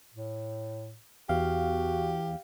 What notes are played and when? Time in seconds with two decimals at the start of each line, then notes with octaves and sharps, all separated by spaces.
0.14 A2
1.29 E2 F#4 G4 F5